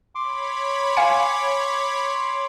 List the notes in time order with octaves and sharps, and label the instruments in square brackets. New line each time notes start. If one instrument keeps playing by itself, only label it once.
[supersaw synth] C#5 B5 [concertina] C6 D6
[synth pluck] F5 G#5 C#7